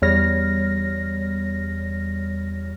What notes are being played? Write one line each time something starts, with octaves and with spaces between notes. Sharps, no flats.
E2 G3 C#5 F6 A#6